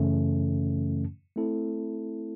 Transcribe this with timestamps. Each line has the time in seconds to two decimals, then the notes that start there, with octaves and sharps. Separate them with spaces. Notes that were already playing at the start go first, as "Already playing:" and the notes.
Already playing: F#2 C#3 E3 A3 C#4
1.36 A3 C4 E4 A4